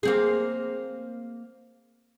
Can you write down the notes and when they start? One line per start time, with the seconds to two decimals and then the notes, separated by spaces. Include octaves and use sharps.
0.03 A#3 C4 G#4